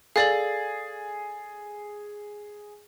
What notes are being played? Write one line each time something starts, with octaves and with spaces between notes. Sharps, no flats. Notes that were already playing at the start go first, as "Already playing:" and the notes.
G#4 A4 D5 F5 A6